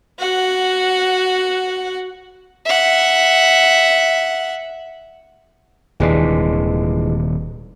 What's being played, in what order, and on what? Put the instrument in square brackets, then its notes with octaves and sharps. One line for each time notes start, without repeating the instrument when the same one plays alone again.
[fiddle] F#4 F#5
[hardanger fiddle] E5 F#5
[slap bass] D#1 D#2 C3 [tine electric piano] E3 G#3 D4